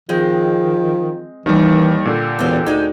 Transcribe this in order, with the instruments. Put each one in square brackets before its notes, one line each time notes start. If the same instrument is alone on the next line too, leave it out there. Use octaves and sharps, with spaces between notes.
[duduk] D#3 [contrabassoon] F3 [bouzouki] G#3 C4 D#5
[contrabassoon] D#2 [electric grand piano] D#3 G3 [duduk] E3
[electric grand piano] A#2 D3 [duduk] G4
[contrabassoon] E1 [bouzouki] C4 D#4 F4
[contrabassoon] D2 [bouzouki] G#3 C4 [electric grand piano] D#4